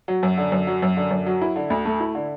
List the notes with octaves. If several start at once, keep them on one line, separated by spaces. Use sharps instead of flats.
F#3
F#2
D3
F#2
F#3
F#2
D3
F#2
F#3
E4
D3
D2
A3
E4
D3